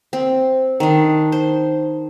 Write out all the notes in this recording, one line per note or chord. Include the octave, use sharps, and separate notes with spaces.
C4
D#3 D4
C5